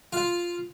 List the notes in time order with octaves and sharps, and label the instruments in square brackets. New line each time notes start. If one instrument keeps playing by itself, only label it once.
[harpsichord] F4